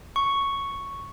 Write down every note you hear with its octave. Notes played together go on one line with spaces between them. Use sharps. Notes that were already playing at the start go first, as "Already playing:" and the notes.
C#6